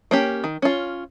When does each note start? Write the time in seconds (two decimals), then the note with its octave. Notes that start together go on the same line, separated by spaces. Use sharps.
0.11 A#3 C#4 G4
0.44 D#3
0.62 C#4 F4